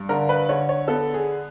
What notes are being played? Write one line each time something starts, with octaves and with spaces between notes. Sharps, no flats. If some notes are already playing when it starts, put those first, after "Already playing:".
Already playing: G2
D3 A#4
B4
D3 C#5
C#5
B3 A4
G#4